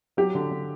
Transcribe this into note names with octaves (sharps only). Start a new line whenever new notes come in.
F#3 G4
D3
D3